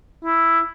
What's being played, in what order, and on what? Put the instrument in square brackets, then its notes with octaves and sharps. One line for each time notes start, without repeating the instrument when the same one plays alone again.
[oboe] E4